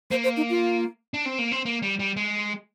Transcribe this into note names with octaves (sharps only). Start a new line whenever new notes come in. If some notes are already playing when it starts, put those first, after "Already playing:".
A#3 C5
C5
D#4
F4
D4
C4
A#3
C4
A#3
G3
G3
G#3